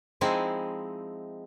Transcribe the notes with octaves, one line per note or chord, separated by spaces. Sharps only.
F3 G#3 C4 D#4 E4